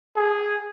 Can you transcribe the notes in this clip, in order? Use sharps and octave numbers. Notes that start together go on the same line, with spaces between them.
G#4